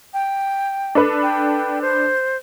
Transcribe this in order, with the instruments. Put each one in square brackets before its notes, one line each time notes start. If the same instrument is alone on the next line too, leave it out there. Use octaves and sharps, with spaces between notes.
[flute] G5
[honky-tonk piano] D4 A4 B4
[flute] G5
C5